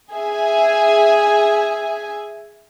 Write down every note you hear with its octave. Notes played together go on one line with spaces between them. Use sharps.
G#4 E5 G#5